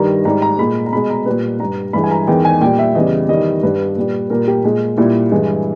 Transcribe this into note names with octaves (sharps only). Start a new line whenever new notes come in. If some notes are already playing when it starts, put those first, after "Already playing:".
Already playing: G2 D#3 G3 A#5
G#2 G3 A#5
A#5
A#2 G#3 B5
A#5
B2 G#3 B5
A#5
A#2 G3 B4
G2 G3 A#5
G2 E3 G#3 B5
G#5
A#5
E2 D#3 G#3 G5
G#5
A#2 G3 G5
E5
E2 C#3 G3 D#5
E2 D#3 G3 D#5
G2 G3 B4
A#2 G3
A#2 G3 A#4
G4
A#2 G#3
A#2 G3 E4
G2 E3 G#3